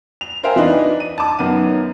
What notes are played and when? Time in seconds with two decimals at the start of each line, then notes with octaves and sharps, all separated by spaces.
0.21 F7
0.43 A#4 C5 E5 F5 G5 G#5
0.56 E3 D4 D#4 B4
1.00 D#7
1.18 A5 D6
1.39 F#2 D#3 B3 D#7